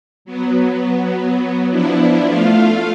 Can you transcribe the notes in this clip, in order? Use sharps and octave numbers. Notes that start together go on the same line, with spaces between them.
F#3 B3
F3 B3 D4 E4
A3 F4 F5